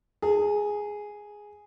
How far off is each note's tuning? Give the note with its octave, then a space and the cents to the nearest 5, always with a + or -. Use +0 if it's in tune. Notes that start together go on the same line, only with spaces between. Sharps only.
G#4 +0 A5 +45